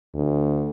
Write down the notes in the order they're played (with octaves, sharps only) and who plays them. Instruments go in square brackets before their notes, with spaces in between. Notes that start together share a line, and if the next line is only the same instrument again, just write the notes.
[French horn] D2